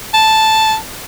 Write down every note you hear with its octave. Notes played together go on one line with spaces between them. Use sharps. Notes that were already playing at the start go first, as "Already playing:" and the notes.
A5